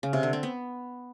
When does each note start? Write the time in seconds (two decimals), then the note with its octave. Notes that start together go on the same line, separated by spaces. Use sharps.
0.03 C#3
0.13 C3
0.23 D3
0.33 C4
0.43 B3